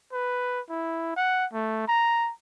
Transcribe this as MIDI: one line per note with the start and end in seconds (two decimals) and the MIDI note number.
0.13 0.61 71
0.70 1.15 64
1.16 1.46 78
1.53 1.84 57
1.88 2.31 82